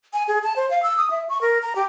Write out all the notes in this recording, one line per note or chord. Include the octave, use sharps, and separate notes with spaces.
G#5
G#4
A5
C5
F5
E6
D#6
E5
C#6
A#4
A#5
G4